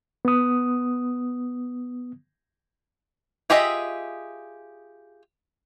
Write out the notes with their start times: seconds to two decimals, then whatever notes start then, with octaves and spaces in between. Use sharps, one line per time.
0.25 B3 D#6
3.50 F4 G4 G#4 D#5 E5